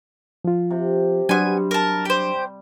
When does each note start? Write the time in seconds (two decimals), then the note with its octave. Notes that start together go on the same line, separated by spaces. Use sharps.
0.45 F3 F4
0.70 C3
1.29 F#3 G3 B3 D4 G#5 C6
1.71 A#4 A5
2.05 G4 C5